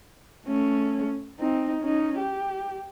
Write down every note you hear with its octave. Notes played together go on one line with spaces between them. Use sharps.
A3 C#4
C4 D#4
C#4 D#4
G4